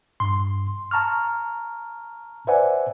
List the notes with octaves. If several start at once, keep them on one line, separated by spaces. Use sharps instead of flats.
G2 C6
A5 A#5 C#6 F6
B4 C5 D5 E5 F#5 G#5